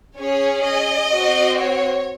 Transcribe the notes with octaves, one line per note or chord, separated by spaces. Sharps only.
C#4 G#4 C#5
D#5
C4 F#4
C#5